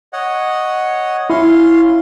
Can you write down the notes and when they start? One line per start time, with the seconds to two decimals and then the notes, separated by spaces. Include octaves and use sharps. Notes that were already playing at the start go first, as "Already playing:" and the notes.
0.13 C#5 D#5 F#5
1.30 C#4 E4 F5 C6